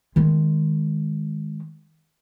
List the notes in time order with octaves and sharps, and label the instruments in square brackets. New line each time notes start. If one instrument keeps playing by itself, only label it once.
[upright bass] D#3 G#3